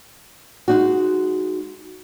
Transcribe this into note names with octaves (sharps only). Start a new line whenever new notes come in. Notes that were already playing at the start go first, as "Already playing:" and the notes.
G#3 D#4 F#4